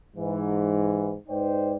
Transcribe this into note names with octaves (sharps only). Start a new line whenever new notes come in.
G#2 E3
G#2 D#4 B4 C5 D5 G5